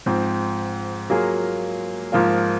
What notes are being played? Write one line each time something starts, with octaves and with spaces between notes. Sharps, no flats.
G#2 F3 C4
F#3 A#3 F4 G#4
G#2 F3 A#3 F4